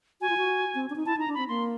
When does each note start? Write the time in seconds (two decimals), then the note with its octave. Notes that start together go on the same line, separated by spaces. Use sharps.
0.21 F#4 G#5
0.29 F4
0.37 F#4
0.75 C4
0.90 D4
0.96 D#4
1.06 E4 A5
1.16 D#4 A#5
1.28 D4
1.34 C4 B5
1.49 A#3 C6